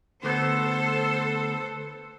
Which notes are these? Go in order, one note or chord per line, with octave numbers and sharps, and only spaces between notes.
D2 B3 A4 C5